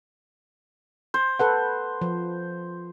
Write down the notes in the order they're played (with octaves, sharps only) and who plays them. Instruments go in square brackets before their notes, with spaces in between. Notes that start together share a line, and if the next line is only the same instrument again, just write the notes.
[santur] C5
[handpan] A4 B4 F#5
F3